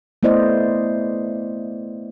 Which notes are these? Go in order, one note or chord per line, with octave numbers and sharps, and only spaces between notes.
A3 B3 E4 C5 D5 D#5